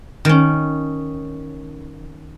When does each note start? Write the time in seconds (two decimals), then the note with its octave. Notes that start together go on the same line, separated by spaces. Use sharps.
0.25 D#3 C#4